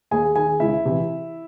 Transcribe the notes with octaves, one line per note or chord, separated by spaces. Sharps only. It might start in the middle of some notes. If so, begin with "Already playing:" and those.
D#2 G#4 G#5
D#3 G#4 G#5
C#2 E4 E5
C3 E3